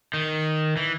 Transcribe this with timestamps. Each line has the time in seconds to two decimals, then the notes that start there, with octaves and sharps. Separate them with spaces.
0.14 D#3
0.76 E3